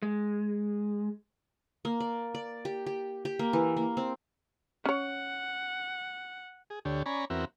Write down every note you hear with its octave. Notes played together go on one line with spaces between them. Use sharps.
G#3
A#3
D5
D5
G4
G4
G4
A#3
E3
A#3
C4
C#4 C#5 F#5
G#4
D2 D3 G4 C#5
C#4 D5 G#5 A#5 B5 C#6
E2 C4 F#4 A#4 E5